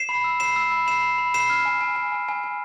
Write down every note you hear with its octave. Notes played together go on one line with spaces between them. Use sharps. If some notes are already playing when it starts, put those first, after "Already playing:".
Already playing: C7 E7
B5
E6
B5 C7 E7
E6
B5
B5 C7 E7
B5
B5
B5 C7 E7
F6
G#5
G#5
G#5
G#5
G#5
G#5